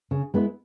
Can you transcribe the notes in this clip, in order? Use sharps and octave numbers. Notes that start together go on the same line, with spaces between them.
C#3
G#3 B3 E4